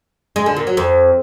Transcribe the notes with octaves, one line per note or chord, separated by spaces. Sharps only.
G#3
D3
A#2
F#3
F2